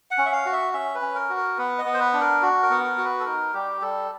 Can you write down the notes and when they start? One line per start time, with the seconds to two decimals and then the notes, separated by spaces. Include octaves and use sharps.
0.11 F#5
0.18 C#4
0.26 E5
0.32 F5
0.46 F#4
0.52 E5
0.73 C#4 E5
0.95 B4
1.02 C#4
1.15 A#4
1.29 F#4
1.36 A#4
1.58 B3 B4
1.78 D#5
1.85 B3
1.94 C5
2.00 B4
2.13 D4
2.21 A#4
2.42 F#4
2.63 A#4
2.70 B3
2.84 A#4
2.98 F#4
3.04 B4
3.20 A4
3.25 D#4 A#4
3.54 G3 G4
3.81 G3 A4